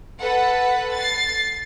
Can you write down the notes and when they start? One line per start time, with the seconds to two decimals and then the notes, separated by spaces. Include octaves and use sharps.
0.20 A4 B4 F#5
0.93 A6 C7